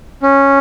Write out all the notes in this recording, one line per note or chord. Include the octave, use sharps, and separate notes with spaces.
C#4